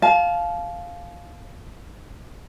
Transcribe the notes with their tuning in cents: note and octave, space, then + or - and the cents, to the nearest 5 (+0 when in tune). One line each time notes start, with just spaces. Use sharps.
F5 +0 A5 -35